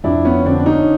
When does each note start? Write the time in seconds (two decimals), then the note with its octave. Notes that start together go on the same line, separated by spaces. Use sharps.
0.04 F2 D4 E4
0.25 B3 C#4
0.45 D3 C4 D4
0.60 D4
0.66 C#4 D#4